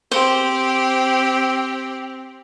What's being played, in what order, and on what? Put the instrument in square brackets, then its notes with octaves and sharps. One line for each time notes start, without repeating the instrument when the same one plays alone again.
[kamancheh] C4 [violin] G4 [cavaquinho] C5